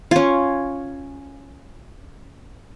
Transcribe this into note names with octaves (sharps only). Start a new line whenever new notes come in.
C#4 F4